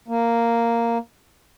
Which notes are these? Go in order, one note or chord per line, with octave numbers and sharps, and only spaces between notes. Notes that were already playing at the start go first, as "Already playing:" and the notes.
A#3